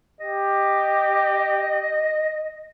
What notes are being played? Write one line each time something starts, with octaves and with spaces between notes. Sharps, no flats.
G4 D#5